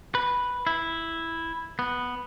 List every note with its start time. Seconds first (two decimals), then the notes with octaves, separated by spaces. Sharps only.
0.15 B4
0.67 E4
1.79 B3